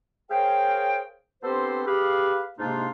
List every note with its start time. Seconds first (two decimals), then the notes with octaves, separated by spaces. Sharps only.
0.31 G#4 A#4 C5 C#5 F5 G5
1.43 B3 C4 D4 G4 A4 C5
1.87 G4 G#4 B4 F5
2.59 G#2 C3 A#3 D4 D#4 F4